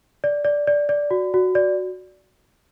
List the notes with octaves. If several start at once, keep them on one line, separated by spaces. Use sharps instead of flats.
D5
D5
D5
D5
F#4
F#4
D5